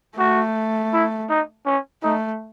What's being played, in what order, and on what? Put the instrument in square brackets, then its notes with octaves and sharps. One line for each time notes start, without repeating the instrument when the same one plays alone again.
[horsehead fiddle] A3 [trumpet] F#4
[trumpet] E4
D#4
C#4
[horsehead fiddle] A3 [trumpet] D#4